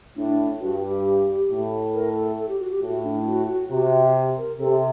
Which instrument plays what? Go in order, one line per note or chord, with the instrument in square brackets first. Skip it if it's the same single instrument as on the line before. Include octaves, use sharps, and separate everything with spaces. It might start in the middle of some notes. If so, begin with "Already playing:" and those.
[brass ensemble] A2 [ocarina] D4
[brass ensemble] G2 [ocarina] F#4
[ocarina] G4
[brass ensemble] A2
[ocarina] A#4
A4
A4
G4
F#4
G4
[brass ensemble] A2 [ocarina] F#4
[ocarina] D4
F#4
F#4
[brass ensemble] C3 [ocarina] F#4
[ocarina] A#4
[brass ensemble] C3 [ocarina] A4